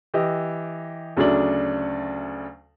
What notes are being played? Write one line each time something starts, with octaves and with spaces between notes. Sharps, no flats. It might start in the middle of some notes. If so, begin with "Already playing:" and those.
E3 G4 D#5
D2 C#3 F#3 A3 D4 F#7